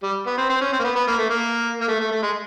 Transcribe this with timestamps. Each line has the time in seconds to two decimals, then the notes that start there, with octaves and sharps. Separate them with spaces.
0.03 G3
0.27 B3
0.38 C4
0.50 C4
0.61 C#4
0.73 C4
0.79 A#3
0.84 B3
0.96 B3
1.07 A#3
1.18 A3
1.30 A#3
1.81 A#3
1.88 A3
2.00 A3
2.11 A3
2.23 G#3